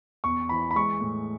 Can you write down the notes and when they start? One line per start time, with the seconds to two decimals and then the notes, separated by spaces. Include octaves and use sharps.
0.24 E2 C#6
0.49 E3 B5
0.71 B5
0.76 G#3 C#6
1.01 A2